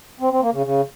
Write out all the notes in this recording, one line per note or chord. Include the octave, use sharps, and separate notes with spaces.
C4
C4
A#3
C#3
C#3